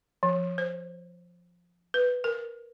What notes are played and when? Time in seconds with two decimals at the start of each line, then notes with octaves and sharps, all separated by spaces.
0.23 F3
0.58 C5
1.94 B4
2.24 A#4